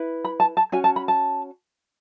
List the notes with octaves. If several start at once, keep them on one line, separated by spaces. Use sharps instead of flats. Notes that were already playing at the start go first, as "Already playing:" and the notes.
Already playing: E4 B4
B5
A5
A5
C#4 F#4 G#5
A5
B5
A5